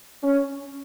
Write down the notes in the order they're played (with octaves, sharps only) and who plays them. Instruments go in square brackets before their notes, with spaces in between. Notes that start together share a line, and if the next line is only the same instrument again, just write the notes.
[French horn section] C#4